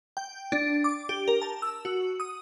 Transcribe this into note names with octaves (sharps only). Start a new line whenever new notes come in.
G5
D4
D6
G4
A#4
A5
E6
F#4
D#6